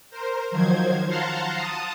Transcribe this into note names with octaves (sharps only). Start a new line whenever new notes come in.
A#4 C5
D#3 F3 F#3 C5 G#6
F5 F#5 A5 A#5 C6
A5 D#6